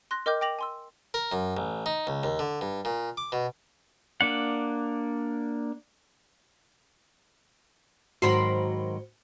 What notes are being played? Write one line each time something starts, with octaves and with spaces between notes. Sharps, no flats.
C6 F#6 A#6
A#4 D#5 G5 D6 F6 G6
G5 D6 A#6 F7 F#7
G#5 C6 E6
A#4
F#2
A1
D#4
C#2
D#2
D3
G2
A#2
D6
B2
A#3 D4 F#5
G#2 D#3 F#3 F#4 A#4 C5 B5 C6